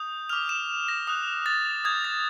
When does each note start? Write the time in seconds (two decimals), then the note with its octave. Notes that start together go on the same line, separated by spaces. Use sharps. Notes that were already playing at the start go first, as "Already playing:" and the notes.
Already playing: D#6 G6
0.29 D6 F6 F7
0.49 E7
0.88 A#6
1.07 D#6 F#6
1.46 A6
1.85 D#6 G6 G#6
2.05 A6